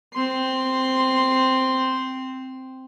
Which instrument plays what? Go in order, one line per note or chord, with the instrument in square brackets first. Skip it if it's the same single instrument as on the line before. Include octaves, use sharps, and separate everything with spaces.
[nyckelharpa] C4 C6